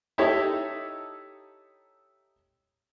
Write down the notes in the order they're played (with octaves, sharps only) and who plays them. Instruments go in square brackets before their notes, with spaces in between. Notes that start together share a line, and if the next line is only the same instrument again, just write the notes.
[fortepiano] D#4 E4 G4 A4 C#5 E5